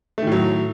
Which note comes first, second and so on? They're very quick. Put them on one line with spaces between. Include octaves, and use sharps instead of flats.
A3 D#3 A2 F#3